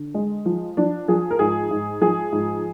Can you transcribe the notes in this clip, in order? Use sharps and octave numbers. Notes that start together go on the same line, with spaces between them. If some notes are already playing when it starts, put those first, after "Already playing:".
Already playing: D3
G#3
F3
F3 D4
F3 G#4
A#4
G#2 G#4
G#2
F3 G#4
G#2